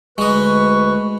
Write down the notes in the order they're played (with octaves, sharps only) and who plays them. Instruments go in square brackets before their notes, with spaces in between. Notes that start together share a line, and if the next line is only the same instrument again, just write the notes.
[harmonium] D2 B4 [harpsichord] G#3 D#5 [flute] C#6